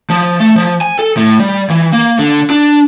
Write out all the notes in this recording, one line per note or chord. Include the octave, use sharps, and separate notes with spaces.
F3
A3
F3
G#5
A4
A2
G3
E3
A#3
D3
D4